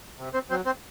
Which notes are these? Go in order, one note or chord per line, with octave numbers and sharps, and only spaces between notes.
C3
C4 C5
F#3 C4 C5
C4 C5